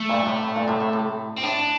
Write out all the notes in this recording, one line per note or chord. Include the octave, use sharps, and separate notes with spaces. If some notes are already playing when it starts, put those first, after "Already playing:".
Already playing: A3
G2 A#2
A2 C3
A2
G2 A#2
A2 C3
A2 C3
A2 C3
C4
A2 D4